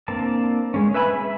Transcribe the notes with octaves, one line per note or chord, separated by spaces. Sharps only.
A#3 C4 D4 A5
G#3 C#4
B4 E5 G#5 B5
E5